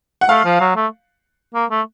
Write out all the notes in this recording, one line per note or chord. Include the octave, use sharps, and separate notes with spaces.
F#5
A3 F5
F3
F#3
A3
A#3
A3